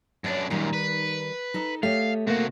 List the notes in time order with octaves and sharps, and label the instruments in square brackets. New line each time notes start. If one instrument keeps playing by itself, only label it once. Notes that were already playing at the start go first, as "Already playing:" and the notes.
[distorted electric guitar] F#2 D4 [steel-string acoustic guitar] A4 B4 C#5
[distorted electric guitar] F#2 A#2 [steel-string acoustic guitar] D#3 G3 D#4
[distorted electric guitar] B4
[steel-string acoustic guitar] D#4 A4 D#5
[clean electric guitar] A3 [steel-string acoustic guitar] G4 C#5 D#5 [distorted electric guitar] F5
[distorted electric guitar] C3 F#4 [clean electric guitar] A3 A#3